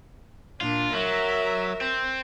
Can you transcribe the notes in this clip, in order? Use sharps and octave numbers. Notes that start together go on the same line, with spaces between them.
A#2 D4 F4
F#3 A#4 E5
C4